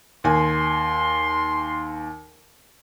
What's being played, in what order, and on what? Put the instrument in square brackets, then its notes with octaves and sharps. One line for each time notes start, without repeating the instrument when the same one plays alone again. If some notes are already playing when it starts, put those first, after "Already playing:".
[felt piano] D#2 G#5 [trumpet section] C6